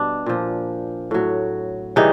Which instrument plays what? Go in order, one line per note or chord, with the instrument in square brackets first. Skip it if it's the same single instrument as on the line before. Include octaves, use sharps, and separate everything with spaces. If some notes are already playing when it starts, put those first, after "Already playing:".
Already playing: [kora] B2 G3 D4
A#2 F3
A2 F#3
C#3 E3 G3 D#4